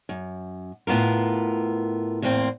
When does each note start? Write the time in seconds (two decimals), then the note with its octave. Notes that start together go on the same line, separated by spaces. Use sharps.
0.09 F#2
0.87 A2 B3 F4 A#4
2.22 E2 A2 A#3 C4